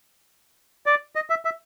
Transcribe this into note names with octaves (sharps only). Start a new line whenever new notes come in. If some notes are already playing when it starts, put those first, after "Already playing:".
D5
D#5
E5
E5